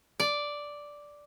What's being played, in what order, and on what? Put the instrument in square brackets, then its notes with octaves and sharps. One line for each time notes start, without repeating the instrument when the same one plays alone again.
[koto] D5